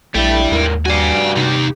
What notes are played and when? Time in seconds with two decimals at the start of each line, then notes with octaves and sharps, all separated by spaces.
0.15 A#1 G2 A3 D4 E4 D5 G5
0.51 D#2 G#2 A#3
0.86 G2 F#4 D5 F5 G#5
1.36 C3 D#4 G4